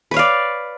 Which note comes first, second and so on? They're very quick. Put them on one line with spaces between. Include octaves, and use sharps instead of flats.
B4 C#5 F5 D5